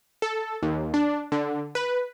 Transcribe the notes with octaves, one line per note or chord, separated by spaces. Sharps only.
A4
D#2
D4
D3
B4